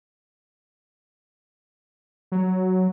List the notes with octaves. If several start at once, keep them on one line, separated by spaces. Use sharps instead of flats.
F#3